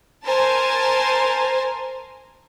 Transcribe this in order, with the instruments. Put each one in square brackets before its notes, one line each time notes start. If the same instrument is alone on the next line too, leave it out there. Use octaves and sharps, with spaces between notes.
[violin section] A#4 C5 G#5 A5